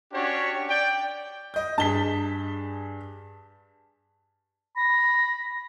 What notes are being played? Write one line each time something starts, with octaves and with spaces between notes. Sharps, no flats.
C#4 D4 F#4 G4 C#5
D5 G5
D#5 G6
G2 G#4 A5 B6 G7
B5 A#6